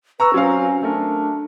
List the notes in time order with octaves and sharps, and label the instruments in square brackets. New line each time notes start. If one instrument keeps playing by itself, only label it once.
[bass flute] B4 [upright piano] A#5 C#6 E6
[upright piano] F#3 C4 F5 [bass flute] C#4
[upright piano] A3 A#4 [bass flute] D4